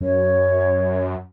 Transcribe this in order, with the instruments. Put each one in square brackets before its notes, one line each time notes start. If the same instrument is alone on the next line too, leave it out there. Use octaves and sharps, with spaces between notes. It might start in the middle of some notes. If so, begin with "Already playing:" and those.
[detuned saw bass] F#2 [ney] C#5